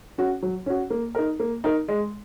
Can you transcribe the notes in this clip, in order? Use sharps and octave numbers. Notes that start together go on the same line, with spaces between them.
C#4 F#4
F#3
C#4 F#4
A#3
D#4 A#4
A#3
D#4 A#4
G#3